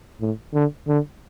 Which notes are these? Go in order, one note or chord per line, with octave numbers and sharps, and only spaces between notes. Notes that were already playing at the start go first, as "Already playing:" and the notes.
A2
D3
D3